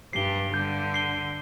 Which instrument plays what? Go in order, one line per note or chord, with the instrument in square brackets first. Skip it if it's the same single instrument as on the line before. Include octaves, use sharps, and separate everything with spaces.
[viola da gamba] G2 G3 [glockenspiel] C7 G7
[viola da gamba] D3 [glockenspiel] G6
[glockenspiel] C7 G7